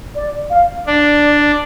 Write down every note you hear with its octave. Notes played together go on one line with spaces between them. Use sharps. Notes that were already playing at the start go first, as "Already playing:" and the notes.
D5
F5
D4 D5